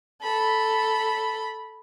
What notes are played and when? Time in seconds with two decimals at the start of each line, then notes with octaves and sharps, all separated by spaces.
0.23 A4 B5